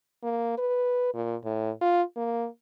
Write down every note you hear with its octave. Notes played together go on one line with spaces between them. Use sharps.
A#3
B4
A#2
A2
F4
A#3